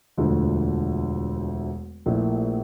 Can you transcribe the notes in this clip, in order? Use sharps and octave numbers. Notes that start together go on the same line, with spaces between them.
E1 D2 D3 F3 A3
A#1 A#2 A3 E4